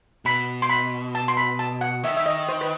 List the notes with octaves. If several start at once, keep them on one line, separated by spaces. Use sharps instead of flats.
B2 B5
C6
B5
A5
C6
B5
A5
F#5
D#3 E5
E5
D#5
C5
B4